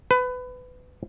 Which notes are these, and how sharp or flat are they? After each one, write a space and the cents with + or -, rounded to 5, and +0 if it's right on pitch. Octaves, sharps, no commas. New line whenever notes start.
B4 +25